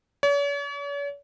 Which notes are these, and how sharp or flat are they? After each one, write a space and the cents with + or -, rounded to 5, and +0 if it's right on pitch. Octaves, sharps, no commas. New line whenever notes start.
C#5 +45